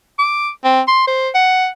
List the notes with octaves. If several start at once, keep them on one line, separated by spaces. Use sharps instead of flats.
D6
C4
C6
C5
F#5